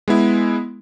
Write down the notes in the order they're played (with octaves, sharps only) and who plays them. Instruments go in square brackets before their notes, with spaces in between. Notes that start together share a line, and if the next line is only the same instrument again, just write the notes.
[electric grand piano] G#3 B3 E4